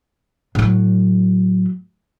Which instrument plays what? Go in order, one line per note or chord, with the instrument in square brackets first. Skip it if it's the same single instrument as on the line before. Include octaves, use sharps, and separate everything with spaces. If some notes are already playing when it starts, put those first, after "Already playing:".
[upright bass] A2 F#3